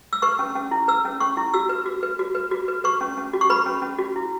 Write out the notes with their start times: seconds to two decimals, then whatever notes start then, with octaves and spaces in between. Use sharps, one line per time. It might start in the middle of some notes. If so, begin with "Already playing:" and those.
0.13 E6
0.22 B4 C#6
0.39 C#4
0.55 C#4
0.71 E4
0.88 B4 E6
1.05 C#4
1.20 C#4 C#6
1.37 E4
1.54 F#4 E6
1.69 B4
1.86 F#4
2.03 B4
2.19 F#4
2.35 B4
2.51 F#4
2.68 B4
2.84 B4 C#6
3.01 C#4
3.18 C#4
3.33 F#4
3.41 C#6
3.50 B4 B5
3.66 C#4
3.82 C#4
3.98 F#4
4.16 E4